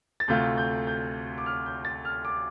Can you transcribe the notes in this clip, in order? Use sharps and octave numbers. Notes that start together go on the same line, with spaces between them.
A6
D2 C3 A3 F4 G6
G6
G6
D6
F6
G6
A6
F6
D6